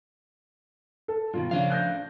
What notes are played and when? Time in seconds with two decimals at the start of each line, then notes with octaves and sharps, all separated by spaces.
1.08 A4
1.34 G2 B2 D#3 F4
1.51 C#3 F3 A3 D4 F5
1.70 F#6 G6 A#6